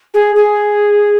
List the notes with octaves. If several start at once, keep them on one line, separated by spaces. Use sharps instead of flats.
G#4
G#4